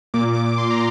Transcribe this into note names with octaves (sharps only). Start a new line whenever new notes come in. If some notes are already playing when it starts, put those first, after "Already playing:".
A#2 D6
A#2 D6
A#2 C6
A#5